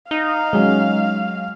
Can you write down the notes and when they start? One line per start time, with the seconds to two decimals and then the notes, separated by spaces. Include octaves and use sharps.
0.11 D#4 F5
0.53 F#3 G#3 C#4